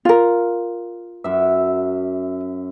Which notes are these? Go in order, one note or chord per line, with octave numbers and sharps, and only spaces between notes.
F4 A#4
F#2 E5